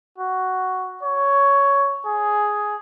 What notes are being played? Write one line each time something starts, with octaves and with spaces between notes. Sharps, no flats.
F#4
C#5
G#4